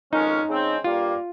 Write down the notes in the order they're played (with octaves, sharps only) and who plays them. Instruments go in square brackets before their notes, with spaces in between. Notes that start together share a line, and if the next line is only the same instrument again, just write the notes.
[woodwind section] F2 D#3 G#3 C#4 [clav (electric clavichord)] D#4
[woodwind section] C#3 G#3 C4
[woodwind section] G2 G3 A#3 [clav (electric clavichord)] F4